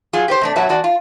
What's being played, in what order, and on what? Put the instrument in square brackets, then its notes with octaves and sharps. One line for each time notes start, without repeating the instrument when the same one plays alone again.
[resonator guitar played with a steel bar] F#3 F4 G#4
G4 B4 C5
C3 A3 D4
B2 F#3 F#4 E5 A5
E2 F#4 D5
F4